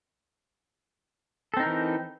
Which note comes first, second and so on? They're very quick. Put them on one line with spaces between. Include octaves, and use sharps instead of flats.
A4 C4 D#4 A#4 E3